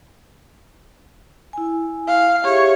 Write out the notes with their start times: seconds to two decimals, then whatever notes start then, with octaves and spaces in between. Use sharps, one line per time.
1.53 E4 G#5
2.08 F5
2.45 G4 G#4 C#5 E5